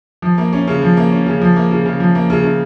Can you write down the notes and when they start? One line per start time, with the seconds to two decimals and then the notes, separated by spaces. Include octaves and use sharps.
0.22 F3
0.38 A#3
0.53 C#4
0.68 C#3
0.82 F3
0.97 A#3
1.12 C#4
1.26 C#3
1.41 F3
1.56 A#3
1.71 C#3
1.86 C#3
2.00 F3
2.15 A#3
2.30 C#3
2.44 C#3